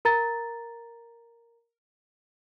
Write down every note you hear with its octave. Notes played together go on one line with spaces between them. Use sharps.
A#4 A#5 A6